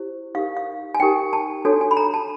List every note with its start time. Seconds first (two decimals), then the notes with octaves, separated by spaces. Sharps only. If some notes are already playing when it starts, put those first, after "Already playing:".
Already playing: E4 G4 C5
0.35 D#4 G4 A#4 F5
0.57 F5
0.95 G#5
1.00 D#4 G4 A#4 G5
1.33 A5
1.65 D4 F#4 A4 C#5 G#5
1.81 G#5
1.91 B5
1.97 A#5
2.14 A5